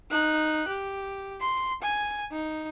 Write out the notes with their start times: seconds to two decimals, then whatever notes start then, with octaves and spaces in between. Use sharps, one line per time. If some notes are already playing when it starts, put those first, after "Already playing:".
0.11 D#4 F#6
0.68 G4
1.40 C6
1.82 G#5
2.32 D#4